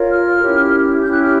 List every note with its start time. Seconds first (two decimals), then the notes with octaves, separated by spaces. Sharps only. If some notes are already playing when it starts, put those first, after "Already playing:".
Already playing: F4 A#4 C#5
0.12 F6
0.42 C#4 E4 G4
1.03 C#4 E4 G4 G6
1.13 F#6
1.23 F6